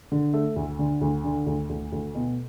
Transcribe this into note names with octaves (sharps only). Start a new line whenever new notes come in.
D3
A3
D2
D3
D2
D3
D2
D2
D2
B2